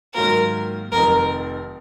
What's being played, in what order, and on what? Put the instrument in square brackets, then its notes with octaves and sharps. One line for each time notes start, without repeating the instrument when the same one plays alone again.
[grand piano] G#2 D#3 F#3 A#3 F4 [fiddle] A#4
[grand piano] F1 F2 D#3 [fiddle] A#4